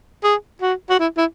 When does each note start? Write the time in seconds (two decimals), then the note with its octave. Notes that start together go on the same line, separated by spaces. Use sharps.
0.23 G#4
0.62 F#4
0.90 F#4
0.99 E4
1.17 E4